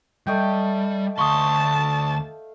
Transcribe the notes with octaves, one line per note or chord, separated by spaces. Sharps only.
G3 A3 D#5 G5
D2 F5 A5 C6 C#6 D#6